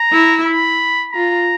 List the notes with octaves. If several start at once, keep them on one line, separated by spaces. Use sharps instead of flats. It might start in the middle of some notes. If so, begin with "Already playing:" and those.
Already playing: A#5
E4
B5
F4 A#5